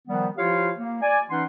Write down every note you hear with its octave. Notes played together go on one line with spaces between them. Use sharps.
D#3 F3 G3 B3
F3 E4 F4 G4 C#5 F5
A#3
D5 G#5
E3 C#4 D#4 F#5 C6